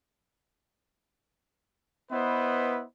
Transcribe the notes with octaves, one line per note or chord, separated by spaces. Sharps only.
B3 E4 B4 C5 D#5